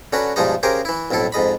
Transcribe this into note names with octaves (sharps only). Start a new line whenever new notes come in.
D3 C#4 F#4 B4 A#5
G2 B2 F3 G#3 D#4 D#5
C#3 G4 A#4 C5 G#5 A#5
E3 E4
B1 F2 A2 E4 A4
F2 G#2 D#5 B5